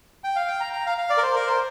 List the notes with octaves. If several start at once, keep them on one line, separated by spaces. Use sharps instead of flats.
G5
F5
G5
A#5
A#5
F5
F5
D5
A#4
C5
A#4
C5